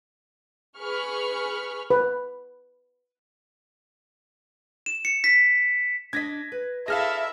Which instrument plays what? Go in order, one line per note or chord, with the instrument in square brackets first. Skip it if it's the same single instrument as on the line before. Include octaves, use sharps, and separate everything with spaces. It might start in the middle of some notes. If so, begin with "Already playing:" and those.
[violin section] G#4 B4 B5 C#6 F6
[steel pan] B4
[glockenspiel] E7
C#7
B6
[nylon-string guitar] D4 D#5 [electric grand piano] G#6 A#6 B6
[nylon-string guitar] B4
[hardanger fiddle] E4 A4 [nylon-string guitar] G#4 [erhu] E5 [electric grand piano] F5 F6 A#6